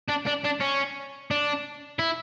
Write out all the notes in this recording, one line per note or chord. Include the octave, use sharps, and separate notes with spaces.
D4
D4
D4
C#4
D4
E4